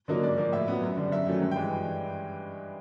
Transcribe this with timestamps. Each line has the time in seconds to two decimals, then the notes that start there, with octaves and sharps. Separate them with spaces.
0.08 D3 F#3 A#3 D#4
0.23 G#2 D5
0.38 F3 A#3
0.52 A2 E5
0.68 F#3 B3
0.82 F#2
0.97 D3 G3
1.12 F#2 E5
1.27 D#3 F#3 A3 C#4
1.42 G2
1.51 G5
1.56 E3 G#3